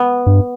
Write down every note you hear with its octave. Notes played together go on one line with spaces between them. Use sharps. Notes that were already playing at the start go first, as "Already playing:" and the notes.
Already playing: B3
G2